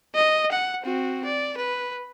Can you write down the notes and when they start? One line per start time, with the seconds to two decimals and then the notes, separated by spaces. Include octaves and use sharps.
0.15 D#5
0.51 F#5
0.83 C4 F#4
1.25 D5
1.57 B4